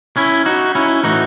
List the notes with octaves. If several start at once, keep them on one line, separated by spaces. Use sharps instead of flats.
C#4 E4
D#4 F#4
C#4 E4
A2 E3 D#4 F#4